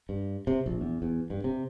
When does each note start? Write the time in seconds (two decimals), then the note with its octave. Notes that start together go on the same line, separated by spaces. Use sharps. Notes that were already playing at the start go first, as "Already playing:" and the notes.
0.09 G2
0.47 C3
0.66 A#1
0.81 E2
1.02 E2
1.30 G2
1.44 C3